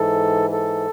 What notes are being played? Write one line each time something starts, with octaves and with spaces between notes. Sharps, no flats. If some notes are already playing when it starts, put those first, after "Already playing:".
Already playing: G#2 E3 A4
A4